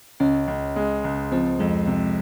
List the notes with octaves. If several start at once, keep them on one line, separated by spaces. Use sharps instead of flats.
C#2 C#4
C#2
G#3
C#2
F3 C4
F2 G#3
C3